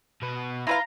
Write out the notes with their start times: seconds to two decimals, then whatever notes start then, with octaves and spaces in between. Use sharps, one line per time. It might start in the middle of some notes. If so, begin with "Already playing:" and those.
0.22 B2 B4
0.67 E4 F4 B4 F5 A#5